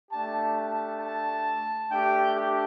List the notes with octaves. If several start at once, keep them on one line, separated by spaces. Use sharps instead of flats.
A3 D4 G4 A5
A5
A5
A3 D4 G4 G5
G4